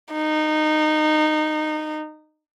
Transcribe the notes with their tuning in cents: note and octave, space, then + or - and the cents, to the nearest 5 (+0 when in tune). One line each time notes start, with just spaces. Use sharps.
D#4 -15